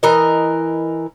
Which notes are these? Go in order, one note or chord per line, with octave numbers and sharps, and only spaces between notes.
E3 A#4 D#5